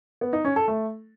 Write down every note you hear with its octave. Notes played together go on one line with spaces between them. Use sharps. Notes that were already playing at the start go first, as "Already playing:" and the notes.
B3
D#4
C#4
A4
A3